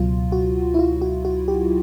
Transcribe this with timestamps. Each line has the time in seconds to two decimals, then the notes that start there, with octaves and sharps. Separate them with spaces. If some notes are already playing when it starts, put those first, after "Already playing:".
Already playing: C#2 B2 F#3 F4
0.32 F#4
0.74 E4
0.79 F4
1.01 F#4
1.25 F#4
1.48 G4